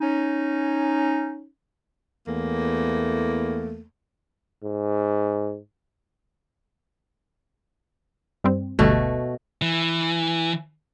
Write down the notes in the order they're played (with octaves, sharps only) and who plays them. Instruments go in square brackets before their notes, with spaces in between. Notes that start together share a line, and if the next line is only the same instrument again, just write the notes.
[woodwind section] C#4 D#4
[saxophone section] E2 A3 A#3
[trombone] G#2
[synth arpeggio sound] G2 G3 C4
[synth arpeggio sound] G1 D2 G3 [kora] B2 A3 F#4
[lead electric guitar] E3